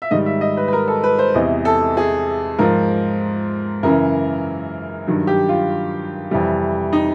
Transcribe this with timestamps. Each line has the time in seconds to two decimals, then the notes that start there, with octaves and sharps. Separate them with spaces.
0.02 E5
0.11 G#2 D#3 G3 D#5
0.26 E5
0.41 D#5
0.57 B4
0.68 B4
0.73 A#4
0.88 A4
1.04 B4
1.19 C5
1.34 E2 C3 E3 D#5
1.65 A4
1.97 G#4
2.59 G#2 F3 A#4
3.83 F#2 C#3 E3 A#4
5.07 G2 D#3 F#3
5.27 G4
5.49 F4
6.31 F2 C3 E3 G3
6.93 D#4